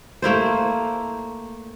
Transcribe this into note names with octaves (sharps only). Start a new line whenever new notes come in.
A3 A#3 E4 C5